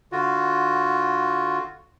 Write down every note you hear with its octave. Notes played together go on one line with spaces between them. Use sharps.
D3 F4 F#4